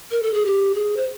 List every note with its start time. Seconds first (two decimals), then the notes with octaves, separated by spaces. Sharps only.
0.11 A#4
0.23 A4
0.34 G#4
0.45 G4
0.75 G#4
0.97 C5